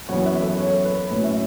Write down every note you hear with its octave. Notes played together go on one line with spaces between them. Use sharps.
F#2 E3 B3 C#5 F#5
B4 E5
A4 C#5
A4 C#5
B4
A2 F#3 C#4 C#5
E5